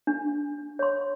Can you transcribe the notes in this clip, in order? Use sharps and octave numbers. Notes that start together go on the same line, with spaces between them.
D4
C#5 C6